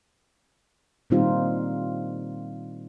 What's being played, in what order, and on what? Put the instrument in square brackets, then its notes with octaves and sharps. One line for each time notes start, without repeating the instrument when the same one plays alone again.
[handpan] A#2 D#3 G3 C4 D#4 F4